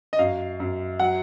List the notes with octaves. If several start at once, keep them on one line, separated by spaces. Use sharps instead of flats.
D#5
F#2 F5
F#2
F#3 F#5